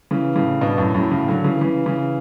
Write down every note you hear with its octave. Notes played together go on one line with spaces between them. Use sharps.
C#3 E3
A2 C#3
G2 B2
F#2 A2
F#2 A2
A2 C#3
D3 F#3
C#3 E3
C#3 E3
C#3 E3